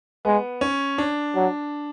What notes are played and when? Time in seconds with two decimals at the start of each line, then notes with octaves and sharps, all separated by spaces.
0.25 G#3 B3
0.61 C#4
0.98 D4
1.35 F#3